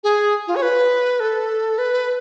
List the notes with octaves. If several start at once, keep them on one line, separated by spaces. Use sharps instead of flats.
G#4
F4
C#5
B4
A4
B4